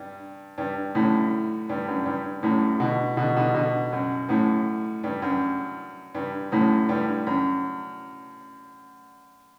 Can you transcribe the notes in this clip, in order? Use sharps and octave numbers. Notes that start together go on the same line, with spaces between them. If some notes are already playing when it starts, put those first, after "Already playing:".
Already playing: G2
G2
F#2 A2
G2
F#2
G2
F#2 A2
B2 D3
B2 D3
B2 D3
B2 D3
F#2
F#2 A2
G2
F#2
G2
F#2 A2
G2
F#2